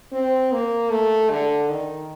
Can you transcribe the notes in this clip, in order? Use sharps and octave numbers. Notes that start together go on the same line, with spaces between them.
C4
A#3
A3
D3
D#3